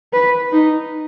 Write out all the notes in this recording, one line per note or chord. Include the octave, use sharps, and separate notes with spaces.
B4
D#4